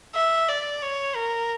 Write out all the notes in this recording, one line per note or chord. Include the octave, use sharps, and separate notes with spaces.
E5
D5
C#5
A#4